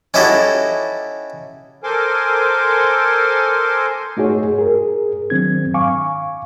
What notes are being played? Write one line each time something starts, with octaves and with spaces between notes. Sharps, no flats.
C#4 D#4 E4 F#4 G4 A4
A4 A#4 C5 G#5 C6 D6
A3 D#4 F#4 G#4 C#5
G#4 A#4
D#3 F#3 C4 D4 G#6
F5 G#5 C#6 D6